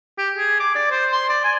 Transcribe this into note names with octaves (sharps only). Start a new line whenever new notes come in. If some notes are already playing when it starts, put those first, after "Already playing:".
G4
G#4
D6
D5
C5
C6
D5
G#5